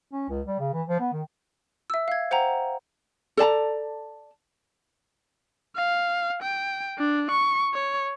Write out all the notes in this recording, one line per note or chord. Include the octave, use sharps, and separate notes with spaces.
C#4
C#2
G3
C#3
E3
F3
B3
D#3
E5 E6
F5 G#6
C5 F#5 G5 A#5
A4 D5 A5 A#5
F5
G5
D4
C#6
C#5